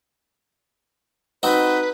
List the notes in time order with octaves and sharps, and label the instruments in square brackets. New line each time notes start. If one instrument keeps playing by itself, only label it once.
[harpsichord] C4 D#4 F#4 [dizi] B4